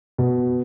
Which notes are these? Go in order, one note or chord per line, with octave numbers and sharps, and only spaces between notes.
B2